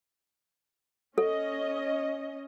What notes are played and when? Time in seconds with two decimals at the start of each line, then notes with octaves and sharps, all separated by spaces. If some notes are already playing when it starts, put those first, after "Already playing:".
1.18 C#4 A4 D#5